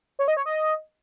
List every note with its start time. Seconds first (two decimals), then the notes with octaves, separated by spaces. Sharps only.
0.19 C#5
0.28 D#5
0.37 C#5
0.46 D#5